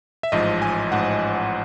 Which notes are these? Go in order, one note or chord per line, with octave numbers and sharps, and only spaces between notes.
E5
A1 G#2 F3 D#5
G#5
A1 G#2 F3 F#5